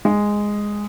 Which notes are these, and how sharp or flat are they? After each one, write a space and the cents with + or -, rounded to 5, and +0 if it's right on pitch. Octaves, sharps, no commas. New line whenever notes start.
G#3 -5